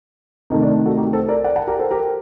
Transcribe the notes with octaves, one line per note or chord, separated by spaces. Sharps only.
C3 D#3 A3 D#4
D4
F#4 A4
D#4 G4
A4 C5
A#4 D5
D5 F#5
F#5 A5
G4 A#4
A4 C5
G4 A#4